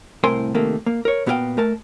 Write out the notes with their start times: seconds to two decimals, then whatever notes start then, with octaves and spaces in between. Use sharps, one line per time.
0.24 C2 A2 C4 A#4 G#5 C6
0.54 C3 D#3 A3 A#3
0.86 A#3
1.05 A#4 C#5
1.26 A#2 B3 F#4 G4 F5 G5
1.57 A3 A#4 A5